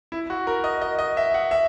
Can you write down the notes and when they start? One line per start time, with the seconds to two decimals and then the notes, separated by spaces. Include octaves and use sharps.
0.12 E4
0.30 F#4
0.47 A#4
0.64 D#5
0.82 D#5
0.99 D#5
1.17 E5
1.34 F#5
1.51 E5